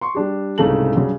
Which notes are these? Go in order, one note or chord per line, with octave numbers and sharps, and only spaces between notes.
C6 C#6
G3 D4 G4
C2 G#2 C#3 A3 A5 F#7
G2 C#3 F#3